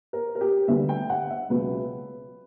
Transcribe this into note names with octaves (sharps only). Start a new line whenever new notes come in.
A#4
A#4
G4
D2 D3 G3 B3 E5
G5
F#5
E5
C#2 B2 F#3 B4